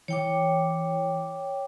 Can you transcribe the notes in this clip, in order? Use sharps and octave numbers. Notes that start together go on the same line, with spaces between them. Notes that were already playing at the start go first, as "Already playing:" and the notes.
E3 C#5 G5 D6